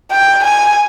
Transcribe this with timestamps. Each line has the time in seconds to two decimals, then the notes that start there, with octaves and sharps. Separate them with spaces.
0.11 G5
0.44 G#5